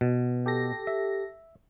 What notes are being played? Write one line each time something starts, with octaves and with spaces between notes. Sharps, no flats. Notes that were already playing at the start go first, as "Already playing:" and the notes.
B2
G4 A4 A#6
E5